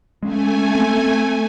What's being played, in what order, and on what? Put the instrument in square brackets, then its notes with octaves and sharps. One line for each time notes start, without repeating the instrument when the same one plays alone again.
[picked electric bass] G#3 C#4 [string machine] A3 G#5
[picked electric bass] C4